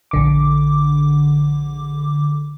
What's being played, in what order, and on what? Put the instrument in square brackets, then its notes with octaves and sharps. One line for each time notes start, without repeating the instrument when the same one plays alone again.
[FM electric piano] A#1 D3 D6